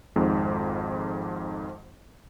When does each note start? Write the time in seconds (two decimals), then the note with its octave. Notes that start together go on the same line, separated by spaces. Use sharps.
0.16 G#1 F2 G#2